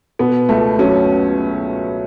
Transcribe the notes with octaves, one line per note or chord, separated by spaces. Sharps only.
B2 B3
C#2 A3
F#3 C#4